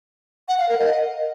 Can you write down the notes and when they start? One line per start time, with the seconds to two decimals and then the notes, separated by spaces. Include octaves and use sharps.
0.48 F#5
0.59 F5
0.69 A#4
0.79 D#5